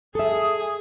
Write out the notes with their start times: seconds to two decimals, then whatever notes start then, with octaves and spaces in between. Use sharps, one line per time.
0.15 G#4 A4 E5 D#6